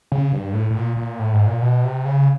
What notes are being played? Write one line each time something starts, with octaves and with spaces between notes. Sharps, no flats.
C#3
G2
A2
A2
A#2
A#2
A2
G#2
A#2
B2
C3
C#3